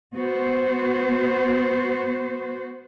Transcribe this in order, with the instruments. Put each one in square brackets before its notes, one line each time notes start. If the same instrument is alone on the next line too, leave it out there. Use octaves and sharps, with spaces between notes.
[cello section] B3 F#4 C5